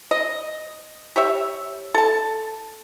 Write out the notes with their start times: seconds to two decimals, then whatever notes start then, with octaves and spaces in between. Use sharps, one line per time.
0.11 D#5
1.16 G4 C#5 E5
1.94 A4 A5